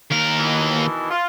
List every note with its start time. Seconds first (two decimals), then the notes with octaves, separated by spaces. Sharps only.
0.11 D#2 A#4
0.39 B2 D#3 E3
1.11 F4